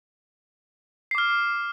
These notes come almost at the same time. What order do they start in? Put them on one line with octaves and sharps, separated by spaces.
C7 D6 F6